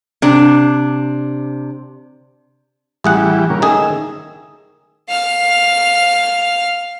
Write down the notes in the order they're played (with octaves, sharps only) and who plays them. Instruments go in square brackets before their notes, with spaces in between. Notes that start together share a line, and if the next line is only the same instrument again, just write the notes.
[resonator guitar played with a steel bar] C3 D4
[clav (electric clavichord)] A1 G#4 F#5 [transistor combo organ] E3 G3
[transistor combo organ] C#3 A#3
[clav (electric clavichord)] D#3 A3 G#4 [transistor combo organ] E6
[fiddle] F5 F6